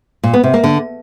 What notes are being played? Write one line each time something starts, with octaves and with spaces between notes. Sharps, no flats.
A#2
B3
C3
A#3
D3